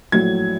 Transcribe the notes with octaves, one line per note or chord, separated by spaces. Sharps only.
A#1 A2 F#3 G#6